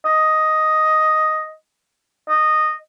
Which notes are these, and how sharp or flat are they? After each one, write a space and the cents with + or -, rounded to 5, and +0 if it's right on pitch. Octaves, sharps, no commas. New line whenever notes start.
D#5 +5
D#5 -10